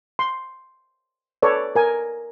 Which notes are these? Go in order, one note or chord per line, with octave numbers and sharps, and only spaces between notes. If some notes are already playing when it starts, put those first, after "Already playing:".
C6
A4 B4 C#5 D5
A#4 G#5